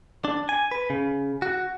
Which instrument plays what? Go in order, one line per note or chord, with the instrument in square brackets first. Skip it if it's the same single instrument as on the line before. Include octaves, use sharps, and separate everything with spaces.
[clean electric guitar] D4
G#5
B4
C#3
F#4